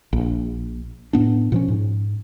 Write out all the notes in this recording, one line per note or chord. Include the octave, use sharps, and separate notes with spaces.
A#1
A2 B3 D4
A#2 F3 C#4
G#2